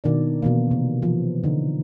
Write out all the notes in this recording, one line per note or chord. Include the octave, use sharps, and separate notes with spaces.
B2 D#3 D4 D5
B2 E3 A#3
C3
E3 F3
D3 D#4